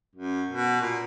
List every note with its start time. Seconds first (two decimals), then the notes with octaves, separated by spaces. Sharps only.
0.15 F#2
0.50 B2
0.81 A#2